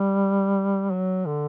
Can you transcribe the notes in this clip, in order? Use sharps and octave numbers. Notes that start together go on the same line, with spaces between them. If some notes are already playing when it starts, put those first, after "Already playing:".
Already playing: G3
F#3
D3